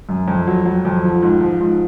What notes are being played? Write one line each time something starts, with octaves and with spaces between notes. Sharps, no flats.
F#2
F2
F#3
F#3
F2
F3
G#2
F3
G#2